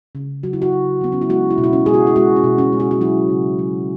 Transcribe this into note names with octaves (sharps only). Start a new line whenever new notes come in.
C#3
F#3 F#4
E4
F#4
C#3
F#3 B3
C#4
E4
G#3 F#4
E4
B2
E4
C#4
G#3 G#4
F#4
E4
G#3 F#4
C#4
B2
C#4
G#3
F#4
F#4
F#3 E4
C#3
F#3